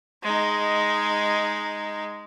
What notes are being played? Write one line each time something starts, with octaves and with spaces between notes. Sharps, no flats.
G#3 D#4